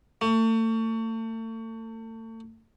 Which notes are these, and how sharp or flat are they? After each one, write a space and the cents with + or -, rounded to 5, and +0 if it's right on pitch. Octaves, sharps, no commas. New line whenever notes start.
A3 +35